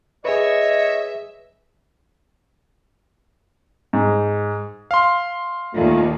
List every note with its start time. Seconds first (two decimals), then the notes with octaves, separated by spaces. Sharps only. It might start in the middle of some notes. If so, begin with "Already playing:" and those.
0.25 G#4 B4 C#5 D#5 E5
3.93 G#2
4.91 F5 C6
5.74 D#2 A#2 D#3 A3 D4 F4